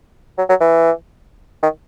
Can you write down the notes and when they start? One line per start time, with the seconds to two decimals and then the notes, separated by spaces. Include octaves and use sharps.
0.38 F#3
0.49 F#3
0.60 E3
1.63 D#3